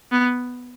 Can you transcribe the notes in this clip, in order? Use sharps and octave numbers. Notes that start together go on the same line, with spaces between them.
B3